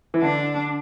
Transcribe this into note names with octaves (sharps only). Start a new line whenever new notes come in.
E3
D3 D4